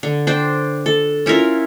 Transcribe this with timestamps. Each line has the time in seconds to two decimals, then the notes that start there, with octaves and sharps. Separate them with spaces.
0.03 D3
0.27 D4 C5 G5
0.86 A4
1.26 C#4 E4 F4 A#4